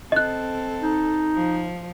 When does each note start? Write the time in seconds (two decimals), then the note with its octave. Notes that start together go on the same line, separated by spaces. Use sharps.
0.12 C4 A4 D#5 F#6
0.83 D#4
1.36 F3